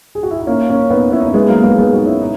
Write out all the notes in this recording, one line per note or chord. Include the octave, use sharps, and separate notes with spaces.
G#4
F#4
E4
D#4
A#3 C#4
A#3 C#4
B3 D#4
C#4 E4
D#4
C#4
G#3 B3
F#3 A#3
G#3 B3
G#3 B3
D#4 F#4
C#4 E4
D#4